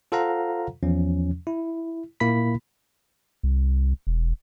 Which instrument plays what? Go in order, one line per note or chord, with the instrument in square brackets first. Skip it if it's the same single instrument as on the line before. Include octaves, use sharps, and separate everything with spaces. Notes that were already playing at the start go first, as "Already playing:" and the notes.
[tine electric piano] F4 A4 C5 F5 F#5 A#5
E2 F3 C#4
E4
A#2 A#3 E4 B5 B6
[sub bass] C2
E1